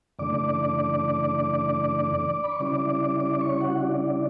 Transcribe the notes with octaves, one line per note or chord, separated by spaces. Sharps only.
F#2 C#3 E3 A3 D4 D5 D6
B5
C#6
C#3 G3 C#4 E4 D5 D6
D5 D6
C#5 C#6
F#4 F#5
D4 D5